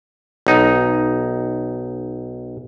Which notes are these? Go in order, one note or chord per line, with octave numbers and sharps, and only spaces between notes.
B1 D#4